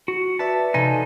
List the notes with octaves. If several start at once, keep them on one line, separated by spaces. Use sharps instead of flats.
F#4
B4 D5 E5 A5
C3 F3 D#4 A4 G#5